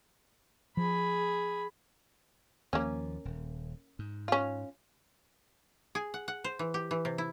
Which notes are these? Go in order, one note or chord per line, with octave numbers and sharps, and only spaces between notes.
F3 G#4 B5
D#2 F3 A#3 C#4
D#1
G#2
C#4 F4
G#4
F#5
F#5
C5
E3
G4
E3
C3
E4